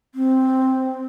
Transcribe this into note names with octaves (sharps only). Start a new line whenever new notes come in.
C4